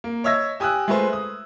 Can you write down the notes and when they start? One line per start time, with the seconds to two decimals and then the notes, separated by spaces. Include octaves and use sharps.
0.04 A#3
0.24 C#5 D#5 E5 E6 G#6 A#6
0.60 G4 G#5 D#6 E6 F#6
0.88 G#3 A3 F4 G#4 B4 C5
1.13 D#6